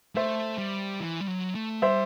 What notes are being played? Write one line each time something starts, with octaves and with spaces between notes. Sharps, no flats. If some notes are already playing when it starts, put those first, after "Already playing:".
A3 C5 E5
G3
E3
G3
F#3
A3
G3 C5 E5